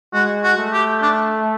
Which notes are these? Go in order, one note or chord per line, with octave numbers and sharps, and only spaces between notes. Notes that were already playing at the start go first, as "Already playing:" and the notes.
G#3 F#4
F#4
A3
G4
D4